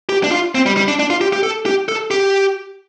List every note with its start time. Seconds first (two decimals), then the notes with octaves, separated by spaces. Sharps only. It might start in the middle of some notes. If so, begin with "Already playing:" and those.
0.09 G4
0.24 D4
0.32 F4
0.55 C4
0.66 G3
0.77 G3
0.88 D4
1.00 D4
1.10 F4
1.21 G4
1.33 G4
1.43 A4
1.66 G4
1.89 A4
2.11 G4